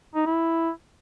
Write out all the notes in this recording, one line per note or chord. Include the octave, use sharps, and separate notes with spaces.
D#4
E4